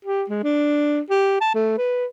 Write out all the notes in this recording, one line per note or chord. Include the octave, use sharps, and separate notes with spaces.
G4
G#3
D4
G4
A5
A3
B4